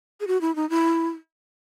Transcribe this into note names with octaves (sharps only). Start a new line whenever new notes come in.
G#4
F#4
E4
D#4
E4